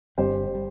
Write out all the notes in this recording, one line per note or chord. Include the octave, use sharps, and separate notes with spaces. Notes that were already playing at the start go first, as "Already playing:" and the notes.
G1 G2 G3 C4 G4 C5
G3